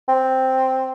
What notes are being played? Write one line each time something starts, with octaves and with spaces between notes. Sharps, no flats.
C4